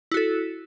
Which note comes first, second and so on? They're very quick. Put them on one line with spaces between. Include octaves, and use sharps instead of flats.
E4 F#4 A4